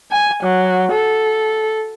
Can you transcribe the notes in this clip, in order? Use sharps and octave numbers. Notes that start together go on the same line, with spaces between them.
G#5
F#3
A4